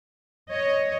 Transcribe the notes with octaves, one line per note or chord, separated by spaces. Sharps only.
C#5 D#5